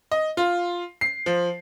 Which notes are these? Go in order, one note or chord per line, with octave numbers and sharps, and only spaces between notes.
D#5
F4
C7
F3